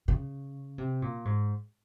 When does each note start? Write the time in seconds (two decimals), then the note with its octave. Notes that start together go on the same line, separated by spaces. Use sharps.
0.08 C#3
0.78 C3
1.02 A#2
1.25 G#2